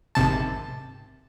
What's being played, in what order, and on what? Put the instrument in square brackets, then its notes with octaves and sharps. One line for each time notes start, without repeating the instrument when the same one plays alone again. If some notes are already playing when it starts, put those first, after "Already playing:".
[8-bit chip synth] G#1 C3 A5